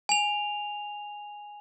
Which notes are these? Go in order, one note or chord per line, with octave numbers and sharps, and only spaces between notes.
G#5 F7